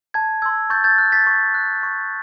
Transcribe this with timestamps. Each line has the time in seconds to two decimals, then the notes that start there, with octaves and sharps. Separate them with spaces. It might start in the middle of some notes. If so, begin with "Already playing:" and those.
0.14 A5 G#6
0.42 C6 E6 G#6
0.70 C#6 G6 A6
0.84 G6 A6
0.98 F#6
1.12 A6 B6
1.27 C#6
1.54 F#6
1.83 C#6